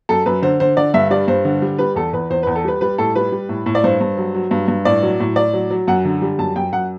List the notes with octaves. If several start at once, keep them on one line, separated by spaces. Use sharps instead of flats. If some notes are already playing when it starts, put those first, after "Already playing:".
F#2 A4
F#2 B4
D3 C5
D3 C5
D3 D5
G2 E5
G3 D5
G2 C5
D3
G3
G3 B4
E2 A4
E2 B4
E2 C5
E2 B4
A4
G3 B4
G3 B4
A2 A4
G3 B4
G3
A2
A2
D5
G2 C5
G2
F#3
F#3
G2
G2
A2 D5
F#3
A2
A2 D5
F#3
F#3
F#2 F#5
D3
G3
F#2 A5
F#2 G5
F#2 F#5